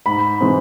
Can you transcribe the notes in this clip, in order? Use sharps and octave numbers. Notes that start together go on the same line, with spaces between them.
G#2 B5
E3 G#3 C4